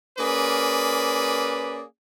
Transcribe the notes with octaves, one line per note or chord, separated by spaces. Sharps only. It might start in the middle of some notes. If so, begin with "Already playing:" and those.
A#3 C#4 G#4 B4 D5